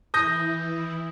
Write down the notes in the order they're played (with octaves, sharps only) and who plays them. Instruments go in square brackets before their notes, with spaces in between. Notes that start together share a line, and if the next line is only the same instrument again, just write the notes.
[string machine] E3 E4 [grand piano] D#6 G6 A#6